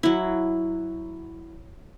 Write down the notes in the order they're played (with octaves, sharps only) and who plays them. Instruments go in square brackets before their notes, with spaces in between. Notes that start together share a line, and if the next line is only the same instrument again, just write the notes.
[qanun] F#3 E4